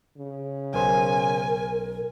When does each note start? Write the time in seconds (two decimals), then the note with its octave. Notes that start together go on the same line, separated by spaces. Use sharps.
0.18 C#3
0.74 B1 A#4 C5 G#5